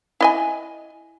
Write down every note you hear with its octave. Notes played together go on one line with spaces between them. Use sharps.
E4 D#5 G#5